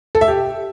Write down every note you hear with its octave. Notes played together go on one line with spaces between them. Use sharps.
A4
E5
G4